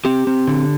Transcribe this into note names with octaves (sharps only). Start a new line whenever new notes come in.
C4 G4
C4
D3